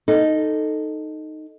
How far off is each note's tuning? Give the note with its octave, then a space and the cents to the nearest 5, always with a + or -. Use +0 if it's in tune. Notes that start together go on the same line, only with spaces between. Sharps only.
D#4 -5 A4 +0